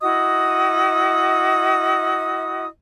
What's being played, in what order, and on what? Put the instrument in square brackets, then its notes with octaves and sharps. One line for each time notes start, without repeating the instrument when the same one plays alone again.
[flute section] E4 F#4 D#5 D#6